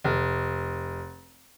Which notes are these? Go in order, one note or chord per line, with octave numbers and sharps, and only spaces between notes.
F1